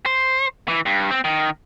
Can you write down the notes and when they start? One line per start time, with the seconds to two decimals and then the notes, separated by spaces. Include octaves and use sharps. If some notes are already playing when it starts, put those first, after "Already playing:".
0.06 C5
0.68 E3
0.86 G2
1.11 C4
1.24 D#3